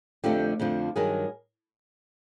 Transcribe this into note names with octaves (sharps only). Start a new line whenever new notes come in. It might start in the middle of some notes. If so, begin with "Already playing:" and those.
F2 D3 F3 A3 D4 G4 A4
F2 D3 F3 A3 D4
G2 D#3 F#3 G#4 A#4